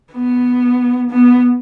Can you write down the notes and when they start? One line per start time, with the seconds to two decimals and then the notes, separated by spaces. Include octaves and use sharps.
0.13 B3
1.11 B3